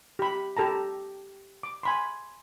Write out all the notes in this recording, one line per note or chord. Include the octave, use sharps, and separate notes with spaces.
G4 B5
G4 A4 A5 A#5
D6
G#5 B5 C6